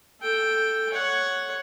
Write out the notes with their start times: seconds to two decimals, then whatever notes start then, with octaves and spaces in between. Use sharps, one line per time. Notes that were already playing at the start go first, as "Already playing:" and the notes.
0.21 A4 G5
0.92 C#5 F#5